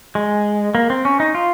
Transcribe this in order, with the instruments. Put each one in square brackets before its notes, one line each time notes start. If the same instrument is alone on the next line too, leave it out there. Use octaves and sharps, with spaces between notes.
[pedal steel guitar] G#3
A#3
C4
C#4
D#4
F4